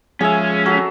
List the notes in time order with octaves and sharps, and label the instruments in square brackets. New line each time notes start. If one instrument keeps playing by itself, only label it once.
[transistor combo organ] F3 G#3 [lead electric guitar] C#4 [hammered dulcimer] G#4 E5
[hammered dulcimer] F#3 A4